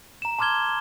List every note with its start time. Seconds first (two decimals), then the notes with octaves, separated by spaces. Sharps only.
0.22 A#5 E7
0.39 A5 C6 D6 F6 G#6 G7